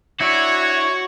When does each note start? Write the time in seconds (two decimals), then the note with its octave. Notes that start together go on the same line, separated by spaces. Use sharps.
0.21 D4 E4 F#4 C#5